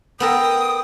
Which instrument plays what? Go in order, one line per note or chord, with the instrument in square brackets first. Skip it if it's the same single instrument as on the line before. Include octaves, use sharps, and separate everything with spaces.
[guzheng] B3 A4 A#4 [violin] G5 [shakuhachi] D#6